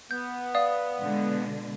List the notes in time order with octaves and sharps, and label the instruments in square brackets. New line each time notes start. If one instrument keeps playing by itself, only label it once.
[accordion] B3 [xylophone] G6
[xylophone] D5 F5 D#6
[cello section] B2 D3 G#3